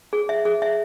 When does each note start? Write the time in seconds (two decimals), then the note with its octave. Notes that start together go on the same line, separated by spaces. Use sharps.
0.13 G#4
0.29 E5
0.45 G#4
0.62 E5